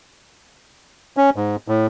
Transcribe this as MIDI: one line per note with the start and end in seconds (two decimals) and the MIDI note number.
1.17 1.30 61
1.36 1.56 44
1.68 1.87 45